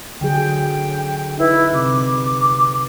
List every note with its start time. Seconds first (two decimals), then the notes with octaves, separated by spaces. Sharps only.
0.21 D3 F#3 G#4 G5
1.38 D#4 E4 B4
1.73 C3 D6